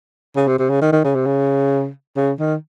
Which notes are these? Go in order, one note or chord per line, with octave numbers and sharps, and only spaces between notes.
C#3
C3
C3
C#3
D#3
D#3
C#3
C3
C#3
C#3
D#3